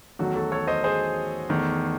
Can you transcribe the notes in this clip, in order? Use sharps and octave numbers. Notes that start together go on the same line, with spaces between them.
E2 D#3 F#3 A3 F#4
F#4 A4
A4 C#5
C5 D#5
G#4 C5
E2 D#3 A3